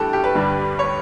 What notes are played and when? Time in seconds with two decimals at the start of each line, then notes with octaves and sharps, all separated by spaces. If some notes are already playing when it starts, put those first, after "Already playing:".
Already playing: A2 E3 G3 D4 F#4 G4 A4
0.13 G4
0.24 B4
0.35 G2 D3 G3 D4
0.79 C#5